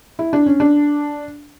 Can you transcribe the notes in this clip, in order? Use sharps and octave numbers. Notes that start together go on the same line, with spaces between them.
E4
D4
C#4
D4